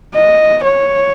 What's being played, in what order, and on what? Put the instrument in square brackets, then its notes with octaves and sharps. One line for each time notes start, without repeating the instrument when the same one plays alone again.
[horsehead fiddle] D#5
C#5